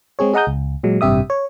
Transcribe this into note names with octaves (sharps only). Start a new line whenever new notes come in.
G#3 C4 G#4 C#5
G#4 D#5 F#5 A#5 D#6 G6
C#2
A#2 F#3 G#3
A1 G2 C3 G4 E5 D#6
C#5